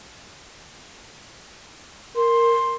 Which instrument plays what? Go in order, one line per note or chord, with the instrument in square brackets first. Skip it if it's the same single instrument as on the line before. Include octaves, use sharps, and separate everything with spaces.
[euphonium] A#4 [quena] C6